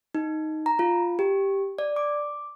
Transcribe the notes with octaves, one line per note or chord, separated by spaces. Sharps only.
D#4
A#5
F4
G4
D5
D6